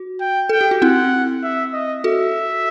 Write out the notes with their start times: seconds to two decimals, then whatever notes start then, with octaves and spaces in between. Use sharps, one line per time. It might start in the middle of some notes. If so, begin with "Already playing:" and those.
Already playing: F#4
0.21 G5
0.49 A4 G5
0.61 G4
0.71 F#4
0.82 C4 E4 F#5
1.44 E5
1.73 D#5
2.04 F#4 A4 E5